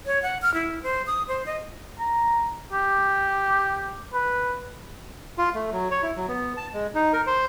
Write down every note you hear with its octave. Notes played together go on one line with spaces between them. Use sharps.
C#5
F#5
F6
E4
C5
D#6
C5
D#5
A#5
G4
B4
F4
A3
F#3
C#5
E4
F#3
B3
A5
G#3
D#4
A#4
C5